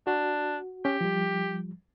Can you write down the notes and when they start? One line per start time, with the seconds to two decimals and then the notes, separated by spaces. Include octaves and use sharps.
0.07 D4 F#4
0.85 C#4 G4
1.01 F3 G3